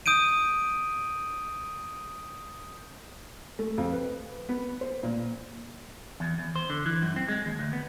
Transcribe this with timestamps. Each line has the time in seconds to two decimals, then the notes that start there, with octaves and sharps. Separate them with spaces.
0.06 D#6 G6 D7 D#7
3.59 A3
3.78 F2
3.92 B4
4.49 B3
4.81 C5
5.03 A#2
6.20 E2
6.39 E2
6.56 C5
6.70 D3
6.86 E3
7.02 F#2
7.16 C4
7.28 G#3
7.46 D#2
7.59 D2
7.73 B3